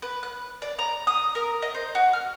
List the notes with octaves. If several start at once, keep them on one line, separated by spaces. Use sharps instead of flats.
B4
F#6
D5
A#5
D#6
A#4
D#5
C5
F#4
F6